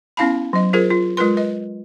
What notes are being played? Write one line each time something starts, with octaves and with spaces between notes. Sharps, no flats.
B3 C#4 E4 F5 A5 B5
F#3 D#5
F4 G#4 A#4 C5
F4
G#3 F4 A#4 B4 C6
B4 D#5